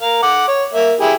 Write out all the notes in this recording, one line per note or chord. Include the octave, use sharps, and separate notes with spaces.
A#4 F5
F#5 D6
C#5
A#3 E5
E4 G4 G#4